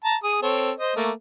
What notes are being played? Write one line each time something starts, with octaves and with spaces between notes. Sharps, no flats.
A5 A#5
G#4 D#6
C4 A4 C#5
C5 D#5
A3 A#3